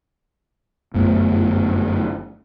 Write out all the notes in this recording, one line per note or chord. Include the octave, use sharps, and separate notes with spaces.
G1 F#2 A3 B3